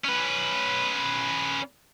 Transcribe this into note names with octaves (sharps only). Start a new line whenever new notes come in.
C#4 B4